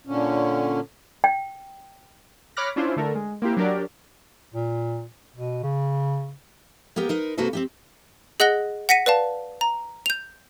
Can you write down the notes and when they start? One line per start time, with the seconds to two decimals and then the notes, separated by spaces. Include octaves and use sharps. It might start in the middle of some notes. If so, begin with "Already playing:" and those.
0.07 A#2 D3 C#4
1.24 G5
2.57 C#5 B5 D6 F6 F#6 A#6
2.76 C#4 D4 E4 F4 C5
2.96 D3 A3 A4 A#4
3.15 G#3
3.42 A#3 C4 E4 G4
3.57 F#3 D4 G4 A#4 D5
4.54 A#2
5.37 B2
5.63 C#3
6.96 A#3 B3 G4 A#4 G5
7.09 D#4 A#4 B4
7.37 C3 A#3 F#4 A4 B4 C5
7.53 C4 D4 G4
8.40 G#4 D#5 F#5 F#6 A#6 G7
8.89 F#5 A#6 B6 C#7 D#7
9.06 B4 D5 F5 A5
9.61 A#5
10.06 G6 F7